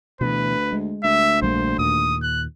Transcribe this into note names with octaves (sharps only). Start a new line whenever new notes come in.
D2 B2 E3 B4
G#3
D2 E5
A#1 G3 A#3 C5
D#2 A#2 D#6
F#6